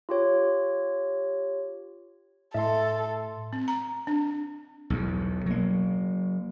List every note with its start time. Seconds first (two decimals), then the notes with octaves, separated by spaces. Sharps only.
0.09 F4 G4 C#5
2.54 A2 A4 E5 C6
3.53 C4
3.68 A#5
4.07 D4
4.90 B1 E2
5.46 F#3 A#3